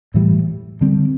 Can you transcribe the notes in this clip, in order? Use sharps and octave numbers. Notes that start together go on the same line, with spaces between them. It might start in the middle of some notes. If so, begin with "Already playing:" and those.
A2 E3 G3
D3 G3 C4